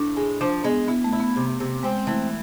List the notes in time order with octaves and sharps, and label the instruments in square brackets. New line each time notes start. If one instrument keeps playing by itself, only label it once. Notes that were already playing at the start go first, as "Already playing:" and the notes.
Already playing: [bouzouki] A2 [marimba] D4
[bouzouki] G#3
[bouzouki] F3 [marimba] D4
[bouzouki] G#3 [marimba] B3
[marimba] B3 [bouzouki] E4
[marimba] A3
[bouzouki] E4
[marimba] B3
[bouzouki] C3
C3
[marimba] G#3 [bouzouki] C4
[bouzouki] E3 [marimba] A3